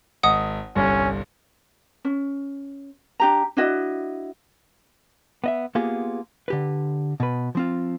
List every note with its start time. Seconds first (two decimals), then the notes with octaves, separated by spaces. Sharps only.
0.23 G#1 D#5 F#5 D#6
0.76 G1 C2 G3 C#4
2.05 C#4
3.20 D4 G4 A#5
3.57 D4 E4 F#4 D#5
5.44 B3 D#5 E5
5.75 A#3 B3 F4 G4 G#4
6.48 D3 G4 B4
7.20 B2 B4
7.55 F3 C4 F4